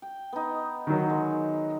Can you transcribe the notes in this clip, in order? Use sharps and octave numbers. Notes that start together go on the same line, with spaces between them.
G5
B3 D#4
D#3 F#3
G#3